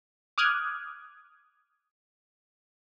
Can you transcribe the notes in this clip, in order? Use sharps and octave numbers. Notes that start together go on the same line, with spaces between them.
D6 D#6 F6 F#6 G#6